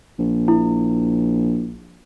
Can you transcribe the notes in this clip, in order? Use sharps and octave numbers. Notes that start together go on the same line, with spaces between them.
A#1
E4